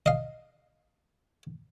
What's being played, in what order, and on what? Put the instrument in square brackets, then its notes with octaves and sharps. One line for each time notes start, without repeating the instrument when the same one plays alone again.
[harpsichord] D#5 F5